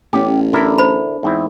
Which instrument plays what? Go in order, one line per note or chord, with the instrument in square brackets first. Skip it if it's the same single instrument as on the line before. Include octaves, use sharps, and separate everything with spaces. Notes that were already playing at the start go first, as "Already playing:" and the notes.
[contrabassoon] A1 [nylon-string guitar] B3 C#4 [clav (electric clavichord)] G4
[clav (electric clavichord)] D3 E4 A#4 [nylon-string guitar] D4 A4
[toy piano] C5 B5
[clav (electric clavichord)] E2 C4 E4 [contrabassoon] G#2